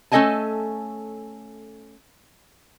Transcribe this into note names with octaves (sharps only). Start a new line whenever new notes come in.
A3 C#4 A4 D#5 G#5 A5